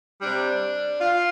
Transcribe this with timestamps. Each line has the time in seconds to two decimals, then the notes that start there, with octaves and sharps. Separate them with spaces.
0.22 C3 G3 D4
1.01 F4